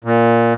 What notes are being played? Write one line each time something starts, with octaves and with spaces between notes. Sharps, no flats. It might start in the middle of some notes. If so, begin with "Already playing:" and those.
A#2